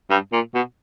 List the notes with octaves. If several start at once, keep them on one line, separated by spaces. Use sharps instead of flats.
G2
A#2
B2